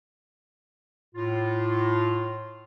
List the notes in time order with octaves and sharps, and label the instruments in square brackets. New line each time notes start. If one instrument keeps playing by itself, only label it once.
[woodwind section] A2 F4